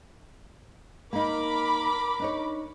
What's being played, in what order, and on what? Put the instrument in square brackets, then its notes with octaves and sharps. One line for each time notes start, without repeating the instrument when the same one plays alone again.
[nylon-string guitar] A#3 D#4 [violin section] A#4 B5 D6
[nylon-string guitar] D4 D#4 C#5